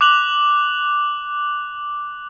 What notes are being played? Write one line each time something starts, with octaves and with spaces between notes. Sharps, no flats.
D6 F#6 F7 F#7